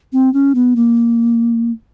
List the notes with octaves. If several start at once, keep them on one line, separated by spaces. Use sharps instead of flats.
C4
C#4
B3
A#3